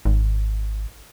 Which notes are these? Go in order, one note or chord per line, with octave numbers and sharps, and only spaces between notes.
G#1